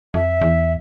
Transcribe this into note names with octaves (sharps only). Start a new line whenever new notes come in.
F2 E5
E2